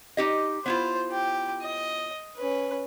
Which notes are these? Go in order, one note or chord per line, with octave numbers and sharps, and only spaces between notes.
D#4 G4 D#5
B3 E4 F4 C5
G4
D#5
C#4 B4